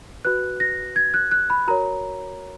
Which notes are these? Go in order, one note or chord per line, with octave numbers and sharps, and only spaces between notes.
F#4 B4 F#6
A#6
G#6
F#6
F#6
B5
F#4 A#4 C#5 A#5